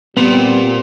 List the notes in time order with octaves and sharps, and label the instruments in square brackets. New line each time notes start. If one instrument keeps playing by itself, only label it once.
[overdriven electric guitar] A#2 [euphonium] G3 [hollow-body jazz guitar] B3 [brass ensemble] C4